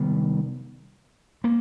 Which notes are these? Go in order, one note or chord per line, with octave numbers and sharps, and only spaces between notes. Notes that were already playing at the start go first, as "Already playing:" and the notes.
Already playing: C3 D#3 G3 B3
A#3